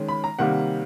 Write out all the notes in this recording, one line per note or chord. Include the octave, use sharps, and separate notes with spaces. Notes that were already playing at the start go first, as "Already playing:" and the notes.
Already playing: D#3 G#3 C#4
B5
A#5
C3 D#3 G3 A#3 F#5